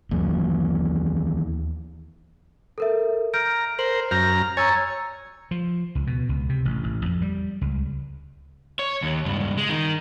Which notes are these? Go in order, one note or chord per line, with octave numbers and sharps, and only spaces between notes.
D#2 E3 F#3 A#3
A4 A#4 E5
A#5 F6 G6 D7
A#4 C5 F#7
F#2 A#5 F6 G6 A#6
C#5 G#5 A#5 E6 A6
F3
C#2
B2
C#2
C3
A1
A1
F2
G3
C#2
C#5
D#2
C#2 G2
G#3
D#3